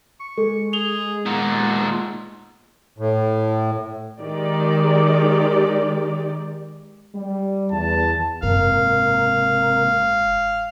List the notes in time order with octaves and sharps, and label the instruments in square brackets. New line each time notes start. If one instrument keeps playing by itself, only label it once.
[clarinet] C#6
[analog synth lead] G#3 [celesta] A4
[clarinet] G#4 [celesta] F7 G7
[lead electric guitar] A#2 D#4 [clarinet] B3
[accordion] A2
[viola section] D#3 G#3 G4 D5
[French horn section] G3
[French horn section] E2 [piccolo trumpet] A5
[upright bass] F#1 G#2 [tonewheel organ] C3 A#3 A#4 [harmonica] F5